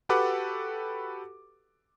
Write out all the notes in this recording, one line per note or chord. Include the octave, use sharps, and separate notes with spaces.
F#4 G4 A4 B4 F#5 D6